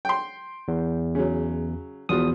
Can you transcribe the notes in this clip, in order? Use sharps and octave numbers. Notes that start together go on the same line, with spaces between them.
G5 C6
E2
C#3 F#3
E2 B2 F3 D#6